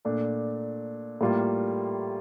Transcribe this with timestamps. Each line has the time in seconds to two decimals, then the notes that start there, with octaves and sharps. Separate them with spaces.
0.05 A#2 A3 D4
1.21 A2 G3 A#3 F4